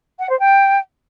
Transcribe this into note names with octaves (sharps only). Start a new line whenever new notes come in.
F#5
C5
G5